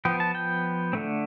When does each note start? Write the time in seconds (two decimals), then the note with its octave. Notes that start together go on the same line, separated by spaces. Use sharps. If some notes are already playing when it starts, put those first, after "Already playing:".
0.05 F3 B3 G5
0.20 A5
0.35 G5
0.93 D3 A3 C4